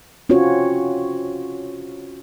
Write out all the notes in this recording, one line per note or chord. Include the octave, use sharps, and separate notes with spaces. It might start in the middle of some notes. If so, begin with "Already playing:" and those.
C4 C#4 F4 F#4 C#5